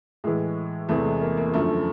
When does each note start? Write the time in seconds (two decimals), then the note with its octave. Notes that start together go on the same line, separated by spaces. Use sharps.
0.24 A2 E3 G#3
0.89 E2 C3 E3 A3
1.05 G#3
1.21 A#3
1.37 A#3
1.54 F#2 D3 F3 A3